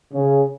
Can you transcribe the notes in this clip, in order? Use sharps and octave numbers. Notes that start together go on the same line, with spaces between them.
C#3